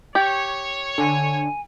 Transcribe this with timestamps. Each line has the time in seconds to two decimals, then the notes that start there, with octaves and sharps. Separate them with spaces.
0.15 G4 C#5
0.98 D3 G#5